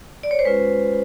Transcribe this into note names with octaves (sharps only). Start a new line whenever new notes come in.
D5
C#5
C5
G#3 C#4 F4 B4